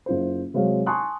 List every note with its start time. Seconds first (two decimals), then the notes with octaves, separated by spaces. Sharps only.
0.06 F#1 F4 C5
0.54 C3 F#3 G#3 C5 C#5 F5
0.86 G#5 A5 C6 C#6 D#6 F#6